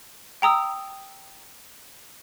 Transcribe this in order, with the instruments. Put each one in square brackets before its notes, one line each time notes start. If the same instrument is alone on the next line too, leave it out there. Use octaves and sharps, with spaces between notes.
[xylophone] G5 A#5 D#6 E6